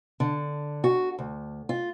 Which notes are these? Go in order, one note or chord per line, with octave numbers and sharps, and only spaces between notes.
D3
F#4
D2
F4